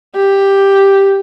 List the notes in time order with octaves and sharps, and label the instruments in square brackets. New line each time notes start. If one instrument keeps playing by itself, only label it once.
[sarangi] G4